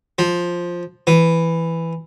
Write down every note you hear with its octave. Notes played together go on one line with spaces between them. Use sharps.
F3
E3